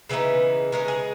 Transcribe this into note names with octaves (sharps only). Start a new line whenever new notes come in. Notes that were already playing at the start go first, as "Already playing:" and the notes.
C#3 E3 B3 D#4 B4
C#3 G#3 D#4 A#4
G#4